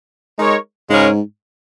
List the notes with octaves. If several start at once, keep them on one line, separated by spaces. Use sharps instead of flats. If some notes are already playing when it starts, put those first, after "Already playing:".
G#3 D#4 A#4 C#5
G#2 C#3 G#3 C#4 A#4 C#5